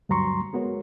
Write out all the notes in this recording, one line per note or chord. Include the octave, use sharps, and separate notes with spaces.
D2 G2 F#3 A#5 C6 C#6
G#3 B3 F#4 A#4 C#5